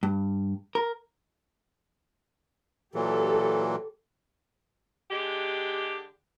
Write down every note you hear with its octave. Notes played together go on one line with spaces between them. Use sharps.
G2
A#4
A#2 E3 F#3 G4 A4
D3 G#3 G4